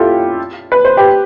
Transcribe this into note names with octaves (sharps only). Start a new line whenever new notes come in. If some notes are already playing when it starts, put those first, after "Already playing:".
Already playing: E4 F4 G4 A4
B4
C5
G4 B4